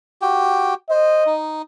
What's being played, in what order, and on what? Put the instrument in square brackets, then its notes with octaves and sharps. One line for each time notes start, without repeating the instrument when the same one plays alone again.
[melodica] F#4 G4 G5
[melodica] C5 [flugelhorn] D#5
[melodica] D#4